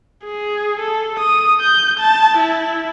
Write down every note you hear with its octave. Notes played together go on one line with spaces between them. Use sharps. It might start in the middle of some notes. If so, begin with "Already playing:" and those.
G#4
A4
D#6
G6
A5
E4